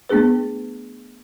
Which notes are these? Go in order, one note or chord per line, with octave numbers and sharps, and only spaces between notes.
A3 B3 D4 G#4 B4